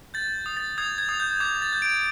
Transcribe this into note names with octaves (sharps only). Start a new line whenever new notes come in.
G6 A6
D#6
A6
D#6 G#6
G#6
D#6
G6
D6 G#6
A6
G6
D7